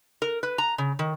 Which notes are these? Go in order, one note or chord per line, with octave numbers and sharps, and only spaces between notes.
A#4
B4
A#5
C#3
D#3